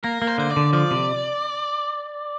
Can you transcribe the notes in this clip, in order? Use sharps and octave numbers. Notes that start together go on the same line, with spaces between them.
A#3 A#4
A#3
C5
D3 C5
D5
D3
F3 D5
C3